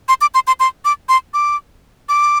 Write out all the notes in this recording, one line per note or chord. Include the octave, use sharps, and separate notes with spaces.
C6
D6
C6
C6
C6
D6
C6
D6
D6